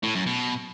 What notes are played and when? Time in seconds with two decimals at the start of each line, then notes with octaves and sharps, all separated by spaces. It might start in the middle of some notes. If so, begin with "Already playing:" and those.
0.03 A2
0.15 F#2
0.27 B2